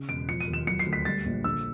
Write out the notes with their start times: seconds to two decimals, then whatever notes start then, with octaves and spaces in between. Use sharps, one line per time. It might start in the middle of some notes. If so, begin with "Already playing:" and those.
Already playing: C#3
0.08 E1 D7
0.28 F3 C#7
0.41 D#7
0.47 D#2
0.53 E7
0.67 F#3 C#7
0.79 C7
0.86 D2
0.93 B6
1.05 G3 A6
1.26 A#1
1.44 D3 E6